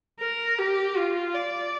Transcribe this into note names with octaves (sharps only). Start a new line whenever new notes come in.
A#4
G4
F4
D5